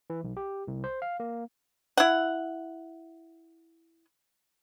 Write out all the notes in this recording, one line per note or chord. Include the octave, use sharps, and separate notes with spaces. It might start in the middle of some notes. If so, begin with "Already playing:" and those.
E3
B1
G4
C2
C5
F5
A#3
E4 F#5